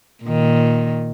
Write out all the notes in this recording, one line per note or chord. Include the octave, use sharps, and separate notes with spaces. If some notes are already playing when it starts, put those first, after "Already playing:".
A#2 D#3